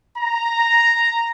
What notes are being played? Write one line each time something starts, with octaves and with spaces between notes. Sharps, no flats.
A#5